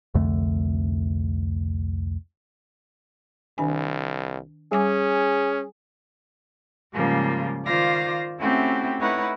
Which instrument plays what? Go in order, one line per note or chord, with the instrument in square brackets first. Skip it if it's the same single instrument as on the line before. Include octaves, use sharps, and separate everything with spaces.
[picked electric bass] C2 F2 D3 A3
[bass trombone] C2 [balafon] D#3 D4 G#5
[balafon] G3 G#5 D6 [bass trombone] C#4 [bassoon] G#4
[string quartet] G#2 C#3 F3 G3 A#3 F4
D#3 F4 C5 D5 F5 A#6
A3 C4 C#4 E4 F#4 G4
A3 D#4 E4 B4 C#5 F#5